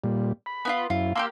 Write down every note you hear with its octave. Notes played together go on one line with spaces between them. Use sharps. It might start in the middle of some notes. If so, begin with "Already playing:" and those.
A#2 G3
B5
B3 E4 F4
F#2 E4 F4
A#3 E4 G4 F5 C6 E6